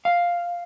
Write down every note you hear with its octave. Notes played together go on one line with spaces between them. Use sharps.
F5